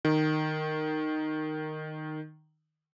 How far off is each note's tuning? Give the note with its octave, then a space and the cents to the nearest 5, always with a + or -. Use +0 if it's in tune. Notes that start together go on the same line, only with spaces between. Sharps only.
D#3 -10